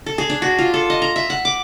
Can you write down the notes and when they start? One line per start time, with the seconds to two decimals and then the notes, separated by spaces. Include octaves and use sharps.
0.06 A4
0.18 G#4
0.30 D4
0.42 F#4
0.59 F4
0.74 A4
0.90 D#5
1.02 A#5
1.16 E5
1.30 F#5
1.45 D6